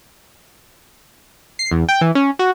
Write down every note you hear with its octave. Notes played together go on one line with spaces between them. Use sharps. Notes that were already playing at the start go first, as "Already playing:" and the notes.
C7
E2
G5
E3
C#4
F#4